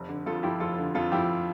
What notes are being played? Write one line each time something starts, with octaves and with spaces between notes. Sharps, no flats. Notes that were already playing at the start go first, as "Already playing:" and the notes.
Already playing: F1
D3
F2 F4 A4
F3 E4 G4
F1 F4 A4
D3
F2 F4 A4
F3 E4 G4